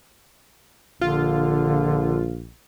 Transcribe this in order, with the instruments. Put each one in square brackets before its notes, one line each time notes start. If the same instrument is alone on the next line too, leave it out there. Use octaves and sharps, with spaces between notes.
[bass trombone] A#1 [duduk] D3 [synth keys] F4